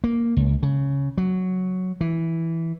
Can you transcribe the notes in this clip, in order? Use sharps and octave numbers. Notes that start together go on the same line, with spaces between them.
A#3
C#2
C#3
F#3
E3